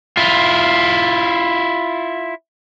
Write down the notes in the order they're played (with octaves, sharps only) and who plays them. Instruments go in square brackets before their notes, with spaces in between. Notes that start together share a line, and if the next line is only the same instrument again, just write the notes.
[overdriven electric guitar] E4 F4